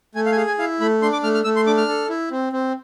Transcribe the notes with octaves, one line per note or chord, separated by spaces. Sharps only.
A3 G#5
F5
G#5
G#4 F5
G#5
E4 F5
A3 B5
D4 C6
D6
A3 F6
F6
A3 E6
C6
D4 D6
F6
A4
E4
C4
C4